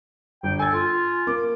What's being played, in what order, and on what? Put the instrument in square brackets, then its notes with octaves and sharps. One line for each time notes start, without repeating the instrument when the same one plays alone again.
[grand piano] G1 [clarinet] G5
[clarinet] A4 [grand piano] G#5 G#6
[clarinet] F4
[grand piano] A#3 D6